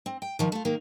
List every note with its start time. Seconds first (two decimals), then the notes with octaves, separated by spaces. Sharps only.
0.06 C4
0.22 G5
0.39 D#3 F3
0.52 A3 F4
0.65 D#3 A#3